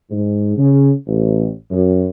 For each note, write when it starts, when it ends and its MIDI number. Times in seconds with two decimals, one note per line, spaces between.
0.10 0.56 44
0.57 0.91 49
1.07 1.48 33
1.71 2.06 42